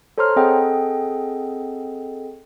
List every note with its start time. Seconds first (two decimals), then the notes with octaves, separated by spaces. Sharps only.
0.18 A4 C5 C#5 A#5 C6 F6
0.36 C4 G#4 A4 D#5 F#5 G5